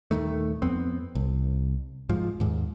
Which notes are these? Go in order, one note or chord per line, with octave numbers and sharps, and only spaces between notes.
D#1 G#1 D#3 A3
F2 B3 C4
C2
G#2 F3
D#2 G#2